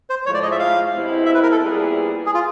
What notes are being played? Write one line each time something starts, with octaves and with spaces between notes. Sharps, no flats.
C5
A2 F3 G#3 C#5
D5
D#5
E5
F5
B2 G#3 C4 E4 G4
E5
B4
A#4
A4
A#2 G3 B3 E4 G#4
G#4
F4